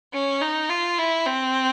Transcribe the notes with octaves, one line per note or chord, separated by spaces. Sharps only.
C#4
D#4
F4
E4
C4